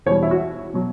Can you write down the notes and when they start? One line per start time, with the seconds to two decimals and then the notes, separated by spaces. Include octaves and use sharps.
0.06 E2 B2 G3 C#5
0.23 E4
0.31 F#4
0.74 B2 F#3